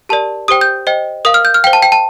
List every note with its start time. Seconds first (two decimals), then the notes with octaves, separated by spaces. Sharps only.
0.09 G4 A#4 D5 A5
0.48 G4 C5 G5 D#6
0.61 G6
0.87 C5 D#5 G5
1.25 A#4 F5 D#6
1.34 F6
1.45 G6
1.54 F6
1.64 C5 F5 G5
1.73 A5
1.82 G5
1.92 A5